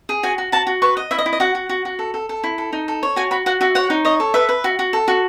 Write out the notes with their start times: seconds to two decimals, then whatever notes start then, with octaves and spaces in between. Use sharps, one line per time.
0.09 G#4
0.23 F#4 G#5
0.38 F#4
0.52 F#4 A5
0.67 F#4
0.82 B4 C#6
0.97 D#5
1.11 E4 E5
1.19 D#5
1.26 E4
1.33 D#5
1.40 F#4 F#5
1.55 F#4
1.69 F#4
1.85 F#4
1.99 A4
2.14 A4
2.29 A4
2.44 E4
2.58 A4
2.73 D#4
2.88 A4
3.03 C#5
3.16 F#4 G#5
3.31 F#4 B5
3.46 F#4 F#5
3.61 F#4 E5
3.75 C#5 F#5
3.90 D#4
4.05 C#5 D#5
4.20 A4
4.34 B4 E5
4.49 B4
4.64 F#4
4.79 F#4
4.93 A4
5.08 F#4